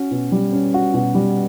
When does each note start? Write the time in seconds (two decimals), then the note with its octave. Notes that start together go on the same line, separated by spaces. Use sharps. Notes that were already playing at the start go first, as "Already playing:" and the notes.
Already playing: C#4 F#4
0.11 B2
0.32 G3
0.52 C#4
0.74 F#4
0.94 B2
1.15 G3